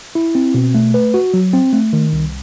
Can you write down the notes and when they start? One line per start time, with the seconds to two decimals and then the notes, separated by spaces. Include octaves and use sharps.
0.15 E4
0.35 C4
0.54 B2
0.75 A3
0.94 B4
1.14 F#4
1.34 F#3
1.53 C4
1.73 A3
1.93 D#3
2.13 C2